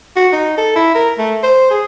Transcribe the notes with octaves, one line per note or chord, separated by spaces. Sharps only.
F#4
D#4
A4
E4
A#4
A3
C5
G#4